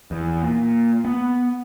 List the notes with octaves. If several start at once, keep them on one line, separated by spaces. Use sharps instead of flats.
E2
A#2
B3